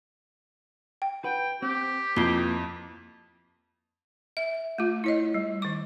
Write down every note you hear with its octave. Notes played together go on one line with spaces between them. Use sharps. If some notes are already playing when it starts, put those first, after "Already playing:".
G5
B4 F#5 G5
C4 G4
F2 A#3 E4 B4 C7 G7
E5
A3 F4
E4 C#5 D#5
G3
D#3 D6